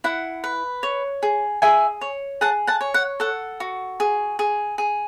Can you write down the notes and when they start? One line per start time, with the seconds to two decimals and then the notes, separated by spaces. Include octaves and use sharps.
0.04 E4 F#5
0.44 B4
0.83 C#5
1.23 G#4
1.62 G#4 E5 G#5
2.01 C#5
2.41 G#4 F#5 A5
2.67 F#5 A5
2.81 C#5
2.94 F#5
3.20 A4 F#5
3.60 F#4
4.00 G#4
4.39 G#4
4.78 G#4